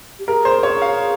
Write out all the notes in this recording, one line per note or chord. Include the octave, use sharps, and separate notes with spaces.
G4
G#4 A#4
C5
C#5
F5